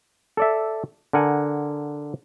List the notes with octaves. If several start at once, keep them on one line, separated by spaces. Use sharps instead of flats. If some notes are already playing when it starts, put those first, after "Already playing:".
A4 D5 E5
D3 A#4 F#5 G#5